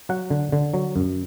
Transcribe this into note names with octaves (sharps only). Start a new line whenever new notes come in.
F#3 F#5
D3
D3
F#3
F#2